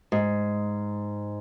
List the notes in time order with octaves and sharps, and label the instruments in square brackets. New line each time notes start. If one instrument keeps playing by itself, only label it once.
[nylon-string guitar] G#2